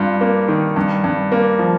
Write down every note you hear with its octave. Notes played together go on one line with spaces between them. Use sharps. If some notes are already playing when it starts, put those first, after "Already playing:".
Already playing: G2 F4
A#3
D#3
G2
G2
A#3
F3